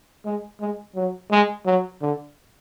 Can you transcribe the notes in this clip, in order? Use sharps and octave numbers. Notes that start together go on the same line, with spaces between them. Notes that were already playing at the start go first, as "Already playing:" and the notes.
G#3
G#3
F#3
G#3
F#3
D3